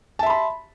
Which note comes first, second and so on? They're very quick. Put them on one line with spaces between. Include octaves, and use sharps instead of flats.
A5 E5 C6 B5